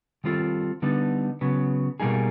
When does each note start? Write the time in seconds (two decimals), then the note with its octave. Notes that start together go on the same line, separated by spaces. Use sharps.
0.24 D#3 G3 C4 F4 A4
0.82 D3 G3 B3 D#4
1.41 C#3 F#3 B3
2.00 B2 G3 A#3 D#4 G#4